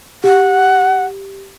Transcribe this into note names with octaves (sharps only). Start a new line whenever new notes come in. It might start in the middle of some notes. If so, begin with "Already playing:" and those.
G4 F#5